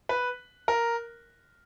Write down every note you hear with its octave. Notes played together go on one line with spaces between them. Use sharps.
B4
A#4